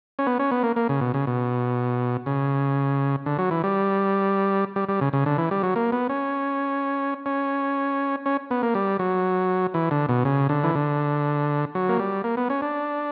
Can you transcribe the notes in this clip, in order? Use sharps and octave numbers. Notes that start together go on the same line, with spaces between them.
C#4
B3
C#4
B3
A#3
A#3
C#3
B2
C#3
B2
C#3
D3
F#3
E3
G3
G3
G3
C#3
C#3
D3
E3
G3
F#3
A#3
B3
C#4
C#4
C#4
B3
A#3
G3
F#3
E3
D3
B2
C#3
D3
E3
D3
F#3
A#3
G3
A#3
B3
C#4
D4